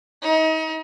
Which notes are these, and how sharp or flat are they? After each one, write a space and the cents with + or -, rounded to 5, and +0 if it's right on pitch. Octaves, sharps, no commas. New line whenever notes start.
D#4 +35